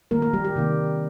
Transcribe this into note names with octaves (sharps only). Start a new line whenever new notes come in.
D#3 G3 A#3 A#4
A#3 A#4
G3 G4
G3 G4
C3 D#3 A#3